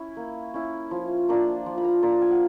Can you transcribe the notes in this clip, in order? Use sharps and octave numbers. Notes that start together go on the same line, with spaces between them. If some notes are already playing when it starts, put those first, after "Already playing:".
Already playing: C#4 E4
A#3
C#4 E4
F3
A#3 D4 F4
F3
B5
A#5
A#3 D4 F4 A#5
G#5
F#5